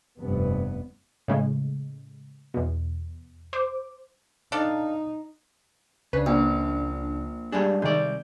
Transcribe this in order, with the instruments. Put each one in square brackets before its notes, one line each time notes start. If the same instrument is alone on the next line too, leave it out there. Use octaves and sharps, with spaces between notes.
[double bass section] F1 G2 B3
[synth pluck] A2 C#3 G#3
E2 B2
C5 D6
[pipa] D4 A4 F5 [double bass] D#4
[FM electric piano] C#2 D4 [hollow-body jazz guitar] C#3 [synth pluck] B4
[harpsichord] A#1
[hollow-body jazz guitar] G3 G#3 D4 [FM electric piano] G4 G#4
[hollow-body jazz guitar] C2 D5 [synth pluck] D#3 G#3 [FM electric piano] G6